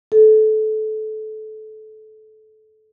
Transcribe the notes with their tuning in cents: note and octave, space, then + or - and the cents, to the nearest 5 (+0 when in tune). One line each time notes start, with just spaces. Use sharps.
A4 -20